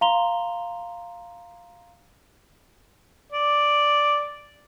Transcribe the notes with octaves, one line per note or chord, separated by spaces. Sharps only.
F5 A#5 C6 F7 G7
D5